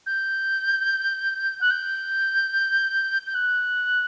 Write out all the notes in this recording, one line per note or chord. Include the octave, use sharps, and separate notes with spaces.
G6
F#6
G6
G6
F#6